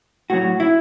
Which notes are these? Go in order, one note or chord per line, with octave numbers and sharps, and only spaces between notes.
A2 F#3 F#4
E4